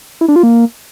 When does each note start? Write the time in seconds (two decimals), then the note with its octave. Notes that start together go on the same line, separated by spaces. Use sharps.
0.21 E4
0.28 D4
0.36 F4
0.43 A#3